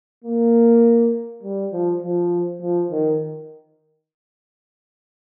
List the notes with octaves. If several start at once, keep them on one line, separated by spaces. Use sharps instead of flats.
A#3
G3
F3
F3
F3
D#3